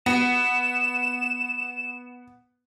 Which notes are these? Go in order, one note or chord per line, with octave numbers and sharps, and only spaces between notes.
B3 E7